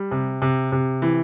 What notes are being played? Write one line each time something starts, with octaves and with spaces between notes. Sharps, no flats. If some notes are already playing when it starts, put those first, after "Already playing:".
Already playing: G3
C3
C3
C3
E3